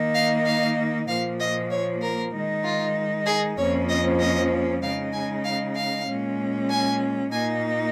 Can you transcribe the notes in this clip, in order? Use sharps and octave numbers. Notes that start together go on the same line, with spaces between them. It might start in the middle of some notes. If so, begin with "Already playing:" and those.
Already playing: D#3 A#3 D#4
F5
F5
A#2 F3 A#3 F5
D#5
C#5
A#4
D#3 G#3 D#4
F4
G#4
F2 F3 A#3 C#4 C#5
D#5
D#5
C#3 G#3 D#4 F5
G#5
F5
F5
A#2 G#3 C#4
G#5
A#2 A#3 D#4 G#5